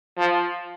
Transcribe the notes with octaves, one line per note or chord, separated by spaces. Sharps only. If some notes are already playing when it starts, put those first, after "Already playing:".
F3